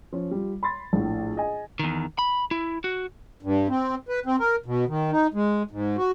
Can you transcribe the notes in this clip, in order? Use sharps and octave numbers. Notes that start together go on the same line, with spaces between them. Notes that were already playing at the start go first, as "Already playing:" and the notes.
F3 C#4
G3 F4
B5 C6 A6
A#1 A2
G#4 D#5 G#5
E2 D#3
B5
E4
F#4
G2
C4
B4
C4
A#4
B2
D#3
D#4
G#3
G#2
F#4